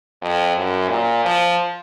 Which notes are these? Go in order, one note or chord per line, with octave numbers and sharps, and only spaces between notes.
F2
F#2
A#2
F3